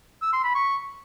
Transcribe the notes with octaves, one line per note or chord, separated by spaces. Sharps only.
E6
C6
B5
C#6